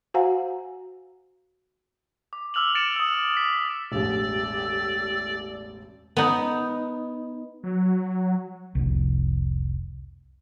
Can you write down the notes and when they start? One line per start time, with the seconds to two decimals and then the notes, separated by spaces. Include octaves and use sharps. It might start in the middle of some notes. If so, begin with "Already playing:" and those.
0.14 F#4 C5 F5 F#5 G#5 A#5
2.33 D6
2.54 D6 E6 F6 F7 F#7
2.75 A6 C#7 D7 E7
2.96 D#6 E6
3.37 B6
3.92 E1 A1 G4 A4 D5 E6
6.17 B3 D#4
7.63 F#3
8.75 F1 C2